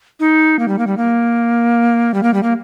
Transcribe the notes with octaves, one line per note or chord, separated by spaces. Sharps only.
D#4
A#3
G3
A#3
G3
A#3
G3
A#3
G3
A#3